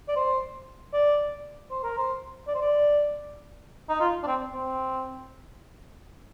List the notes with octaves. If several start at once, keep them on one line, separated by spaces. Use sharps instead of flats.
D5
C5
D5
C5
A#4
C5
D5
C5
D5
D#4
F4
D4
C4
C4